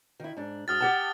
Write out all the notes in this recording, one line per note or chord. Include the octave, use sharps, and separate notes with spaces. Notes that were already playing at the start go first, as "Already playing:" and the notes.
D#3 E4
G#2 D4
G#2 F#4 D#6 F6 A6
G4 F#5 A5